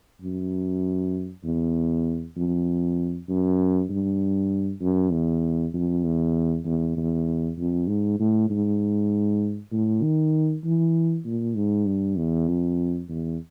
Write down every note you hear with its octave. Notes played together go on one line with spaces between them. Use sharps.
F#2
E2
F2
F#2
G2
F#2
E2
F2
E2
E2
E2
F2
G#2
A2
G#2
A2
D#3
E3
A#2
G#2
G2
E2
F2
E2